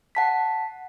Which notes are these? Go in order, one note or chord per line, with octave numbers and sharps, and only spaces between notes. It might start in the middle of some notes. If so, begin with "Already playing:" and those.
F#5 A5 B6